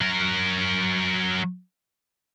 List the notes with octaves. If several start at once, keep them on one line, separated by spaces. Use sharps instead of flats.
F#3 A#4